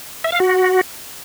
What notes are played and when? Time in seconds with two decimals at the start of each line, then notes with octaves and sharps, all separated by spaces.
0.24 E5
0.32 F5
0.40 F#4